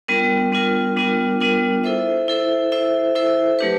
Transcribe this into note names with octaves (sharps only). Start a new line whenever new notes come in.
G3 B3 D4 F4 A#4
G3 B3 D4 F4 A#4
G3 B3 D4 F4 A#4
G3 B3 D4 F4 A#4
E4 A4 C5 E5
E4 A4 C5 E5
E4 A4 C5 E5
E4 A4 C5 E5
F#3 A3 D4 G4 B4